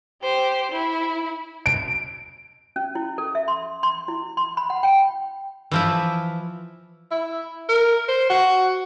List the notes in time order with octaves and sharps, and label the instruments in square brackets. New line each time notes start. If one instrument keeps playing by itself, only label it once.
[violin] G4 C5
E4
[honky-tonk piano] D7
[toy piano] C#4
E4
A4
E5
C6
C6
E4
C6
B5
F#5
G5
[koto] E3 F3 E4
[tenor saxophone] E4
A#4
C5
F#4